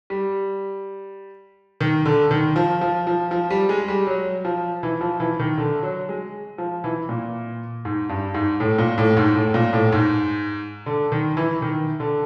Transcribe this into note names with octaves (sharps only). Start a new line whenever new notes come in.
G3
D#3
D3
D#3
F3
F3
F3
F3
G3
G#3
G3
F#3
F3
E3
F3
E3
D#3
D3
F#3
G#3
F3
E3
A#2
G#2
G2
G#2
A2
A#2
A2
G#2
A2
A#2
A2
G#2
D3
D#3
E3
D#3
D3